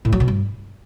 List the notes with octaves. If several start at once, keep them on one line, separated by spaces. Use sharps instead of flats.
A2
F#3
B2
G2